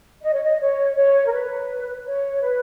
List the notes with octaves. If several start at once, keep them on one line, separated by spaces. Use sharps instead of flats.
D#5
C#5
D#5
C#5
C#5
A#4
B4
C#5
B4